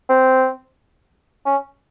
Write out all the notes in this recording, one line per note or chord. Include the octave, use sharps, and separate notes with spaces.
C4
C#4